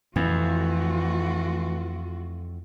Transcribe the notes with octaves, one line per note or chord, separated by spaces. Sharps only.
F2 E3 A3 F4 F#4